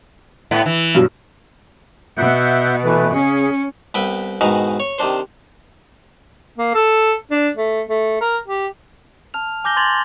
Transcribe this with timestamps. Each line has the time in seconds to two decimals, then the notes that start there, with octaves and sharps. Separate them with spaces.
0.51 A2 B3
0.66 E3
0.95 G2 B2 F#3
2.18 B2 E5 F#5 G6
2.84 E3 A3 B4
3.14 C#3 C#4 G#4
3.94 C2 B3 B4 E5 G5
4.41 G#2 B2 D#3 E3 D#4
4.80 C#5
4.98 C3 D#3 D4 C5
6.58 A#3
6.75 A4
7.31 D4
7.57 A3
7.89 A3
8.21 A#4
8.47 G4
9.34 A5 F6 F7
9.64 G#5 D6 G6 A#6 G7
9.77 C6 G#6 A6 F7 F#7